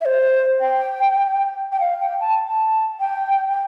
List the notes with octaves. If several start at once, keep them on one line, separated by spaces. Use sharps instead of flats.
E5
C5
G5
G5
F5
G5
A5
A5
G5
G5